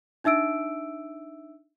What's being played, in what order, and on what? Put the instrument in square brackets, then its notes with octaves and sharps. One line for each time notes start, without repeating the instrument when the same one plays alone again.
[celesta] D4 D#4 E5 E6 D7